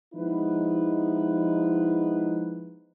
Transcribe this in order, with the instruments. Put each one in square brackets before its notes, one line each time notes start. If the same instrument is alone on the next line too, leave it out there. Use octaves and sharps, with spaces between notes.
[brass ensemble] F3 G#3 B3 D#4 E4 B4